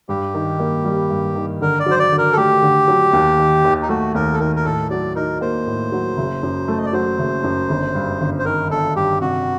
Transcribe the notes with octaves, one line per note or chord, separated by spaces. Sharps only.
G2 G4
D#3
A#3
G3
G2
D#3
D3 A#4
D5
F#3 C5
D5
D3
A#4
A4
A3 G4
D3
F#3
D#2
D#3
D#2
D#4
A3 F#4
D#2 A#4
A4
D#3 A#4
A#4
A2 A4
F#3 D5
D#4 A#4
A#3 C5
A2
F#3
F#1
F#2
A3
D#5
D5
F#3 C5
F#1
F#2
G1
G2
G1
C5
D#3 A#4
G1 A4
G2 G4
C3 F#4